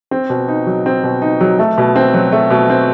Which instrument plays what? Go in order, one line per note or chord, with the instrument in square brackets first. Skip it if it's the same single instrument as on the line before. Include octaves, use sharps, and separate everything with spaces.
[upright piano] C4
B2
D#4
F#3
C4
B2
D#4
F#3
A3
B2
C4
F#3
A3
B2
C4